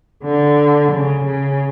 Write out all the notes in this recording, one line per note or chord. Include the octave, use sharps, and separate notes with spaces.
D3
C#3
C#3